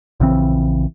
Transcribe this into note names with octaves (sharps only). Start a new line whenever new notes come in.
A#1 C#3 E3 C4